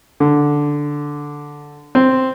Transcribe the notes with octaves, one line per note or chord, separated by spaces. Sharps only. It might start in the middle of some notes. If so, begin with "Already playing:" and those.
D3
C4